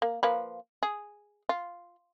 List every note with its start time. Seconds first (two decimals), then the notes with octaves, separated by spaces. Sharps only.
0.02 A#3
0.23 F3 A#3 B4
0.83 G#4
1.49 F4